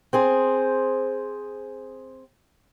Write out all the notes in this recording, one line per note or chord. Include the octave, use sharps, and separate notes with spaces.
C4 G#4 C5